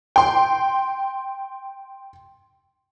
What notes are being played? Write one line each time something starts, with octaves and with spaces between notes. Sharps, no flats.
G5 C6